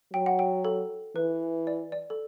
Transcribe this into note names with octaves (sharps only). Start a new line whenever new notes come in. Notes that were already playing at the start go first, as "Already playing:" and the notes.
F#3 G5
F#5
G5
A4
E3 B4
D5
D5
A4